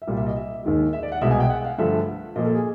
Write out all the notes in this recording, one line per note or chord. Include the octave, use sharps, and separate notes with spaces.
E5
C2 A#2 G3 F5
E5
D#5
E5
D#2 D#3 G#3
E5
D5
F#5
C2 B2 G#3 E5
G#5
G5
F#5
F5
G2 D3 F3 A3 E5
A#2 F3 A#3 D#5
A4
G#4